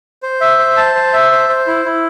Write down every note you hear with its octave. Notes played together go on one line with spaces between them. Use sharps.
C5
E5
C5
A5
C5
E5
C5
C5
E4
E4